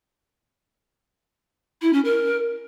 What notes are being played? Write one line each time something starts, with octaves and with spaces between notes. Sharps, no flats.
E4
C#4
A#4